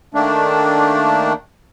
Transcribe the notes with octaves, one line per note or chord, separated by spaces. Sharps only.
D#3 A3 A#3 D4